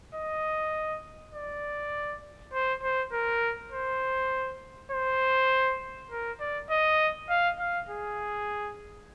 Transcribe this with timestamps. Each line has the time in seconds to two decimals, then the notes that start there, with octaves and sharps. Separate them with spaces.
0.15 D#5
1.34 D5
2.53 C5
2.83 C5
3.12 A#4
3.72 C5
4.92 C5
6.11 A#4
6.40 D5
6.70 D#5
7.29 F5
7.60 F5
7.89 G#4